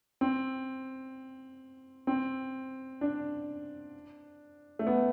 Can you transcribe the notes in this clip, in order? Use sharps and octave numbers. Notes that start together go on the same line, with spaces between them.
C4
C4
D4
A3
B3